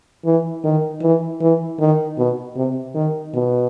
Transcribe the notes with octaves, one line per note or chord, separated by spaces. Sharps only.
E3
D#3
E3
E3
D#3
B2
C3
D#3
B2